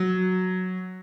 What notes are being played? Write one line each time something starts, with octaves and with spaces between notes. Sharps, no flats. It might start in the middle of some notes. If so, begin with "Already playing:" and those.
Already playing: F#3